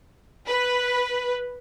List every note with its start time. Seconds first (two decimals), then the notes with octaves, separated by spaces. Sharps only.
0.47 B4